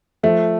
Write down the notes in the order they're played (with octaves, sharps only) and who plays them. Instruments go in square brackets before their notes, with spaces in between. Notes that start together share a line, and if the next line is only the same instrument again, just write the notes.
[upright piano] F3 A3